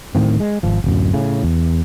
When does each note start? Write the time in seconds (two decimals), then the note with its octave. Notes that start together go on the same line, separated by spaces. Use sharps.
0.15 D1 A2 D#3 C4
0.40 G#3
0.63 G#1 F3
0.84 D1 F#2
1.14 A2 C#3
1.43 E2